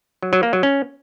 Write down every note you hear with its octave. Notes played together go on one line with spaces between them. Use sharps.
F#3
F#3
A#3
F#3
C#4